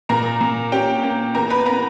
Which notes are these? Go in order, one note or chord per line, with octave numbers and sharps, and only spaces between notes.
A#2 A#4 A#5
A#2
C#4 G4 G5
A#3
E2 A#4 A#5
B4 B5
B3 A#4 A#5